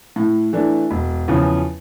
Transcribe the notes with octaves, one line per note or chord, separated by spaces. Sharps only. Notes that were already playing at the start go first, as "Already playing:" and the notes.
A2
E3 A3 D4
E1
E2 C#3 F3 C#4